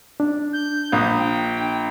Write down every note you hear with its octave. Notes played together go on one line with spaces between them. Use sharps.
D4
G6
A#1 D#6
G5